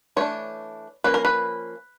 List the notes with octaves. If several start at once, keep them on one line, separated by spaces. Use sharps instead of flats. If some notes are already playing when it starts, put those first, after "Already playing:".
E3 A3 D4 C#5
F3 A#3 C#4 B4
A#4
B4